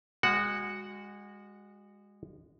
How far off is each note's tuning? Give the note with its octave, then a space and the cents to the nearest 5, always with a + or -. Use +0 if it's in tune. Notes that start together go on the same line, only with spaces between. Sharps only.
G#3 -30 F#4 +0 F#5 +0